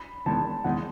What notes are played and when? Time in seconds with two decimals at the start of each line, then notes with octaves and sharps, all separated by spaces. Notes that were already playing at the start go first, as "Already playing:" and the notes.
Already playing: B5
0.26 E2 D#3 G#3 A5
0.64 E2 D#3 G#3 F#5